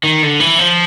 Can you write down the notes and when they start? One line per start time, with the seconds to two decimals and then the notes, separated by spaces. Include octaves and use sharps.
0.03 D#3
0.22 D3
0.40 E3
0.59 F3